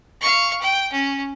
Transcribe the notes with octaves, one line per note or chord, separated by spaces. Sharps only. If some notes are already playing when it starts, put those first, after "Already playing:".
F5 C#6
G5
C#4